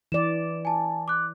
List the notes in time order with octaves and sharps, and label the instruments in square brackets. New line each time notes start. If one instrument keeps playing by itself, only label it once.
[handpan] E3 D5 [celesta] E7
[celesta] G#5 A5
D6 F#6